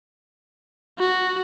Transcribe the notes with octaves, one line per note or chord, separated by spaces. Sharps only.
F#4